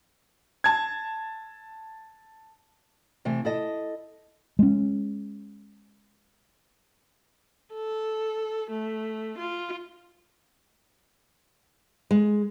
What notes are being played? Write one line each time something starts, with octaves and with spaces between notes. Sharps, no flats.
A5 G#6
C3 E3 A3
E4 A4 D#5
G#3 C#4
A4
A3
F4
G#3